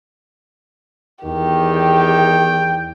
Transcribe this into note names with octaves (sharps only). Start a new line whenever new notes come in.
E2 D#3 G4
G5